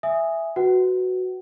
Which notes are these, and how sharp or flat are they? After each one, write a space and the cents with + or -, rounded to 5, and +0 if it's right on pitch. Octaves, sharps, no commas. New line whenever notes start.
E5 +5 G#5 -10 D#6 +0
F#4 +0 B4 +5 F#5 +40